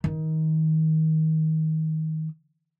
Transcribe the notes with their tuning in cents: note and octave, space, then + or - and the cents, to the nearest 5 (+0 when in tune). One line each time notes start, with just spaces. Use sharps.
D#3 +25